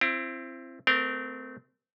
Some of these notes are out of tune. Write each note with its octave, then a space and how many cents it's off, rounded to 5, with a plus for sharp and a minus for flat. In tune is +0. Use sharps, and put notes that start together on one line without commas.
C4 +10 E4 +40
A3 +0 C4 -30 A#4 +0